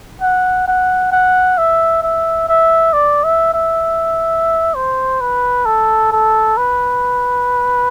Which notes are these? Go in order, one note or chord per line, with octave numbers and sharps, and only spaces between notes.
F#5
F#5
F#5
E5
E5
E5
D5
E5
E5
C5
B4
A4
A4
B4